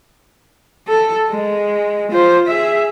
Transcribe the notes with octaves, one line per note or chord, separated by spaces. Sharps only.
A4
G#3
F4 C5
G#4 E5